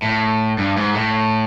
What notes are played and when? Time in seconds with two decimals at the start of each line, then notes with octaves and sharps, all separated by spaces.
0.02 A2
0.58 G2
0.77 G#2
0.94 A2